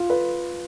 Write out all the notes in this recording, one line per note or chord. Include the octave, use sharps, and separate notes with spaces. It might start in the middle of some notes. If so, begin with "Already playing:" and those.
Already playing: F4
B4